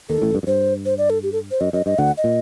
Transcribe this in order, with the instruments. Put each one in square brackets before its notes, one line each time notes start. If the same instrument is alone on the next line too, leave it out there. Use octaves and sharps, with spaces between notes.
[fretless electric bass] D#2 D#3 [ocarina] A4
[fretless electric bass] A1 A2
G2
F#2
[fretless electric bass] G2 [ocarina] C5
[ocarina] C5
D5
A4
G4
A4
C5
[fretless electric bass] F#2 [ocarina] D#5
[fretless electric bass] F#2 [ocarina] D#5
[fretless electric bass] G2 [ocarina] D#5
[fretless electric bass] D2 D3 [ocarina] F#5
[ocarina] D#5
[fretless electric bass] A#2